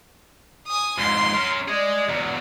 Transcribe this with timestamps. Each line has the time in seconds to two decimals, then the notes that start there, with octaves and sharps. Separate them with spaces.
0.67 G#5 D#6
0.98 F2 G#2 C6
1.33 C#4 A#4
1.68 G#4 D5 D#5
2.09 E2 F#3